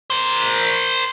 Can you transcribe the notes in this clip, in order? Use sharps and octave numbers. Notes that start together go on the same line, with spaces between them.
A#4 C5